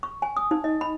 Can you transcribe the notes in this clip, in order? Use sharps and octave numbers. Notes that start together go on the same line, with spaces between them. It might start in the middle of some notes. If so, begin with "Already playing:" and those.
C#6
G#5
D#6
D#4
D#5
B5